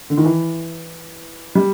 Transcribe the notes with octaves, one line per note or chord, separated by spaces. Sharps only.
D3
D#3
E3
G3